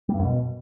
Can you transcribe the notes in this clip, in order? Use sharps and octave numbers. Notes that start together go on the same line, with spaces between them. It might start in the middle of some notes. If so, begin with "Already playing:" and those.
G3
G2
F#2
B2